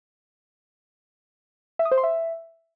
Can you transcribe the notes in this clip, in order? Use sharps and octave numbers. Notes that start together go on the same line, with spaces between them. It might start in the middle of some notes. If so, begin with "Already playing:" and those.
E5
D#6
C5
C6
E5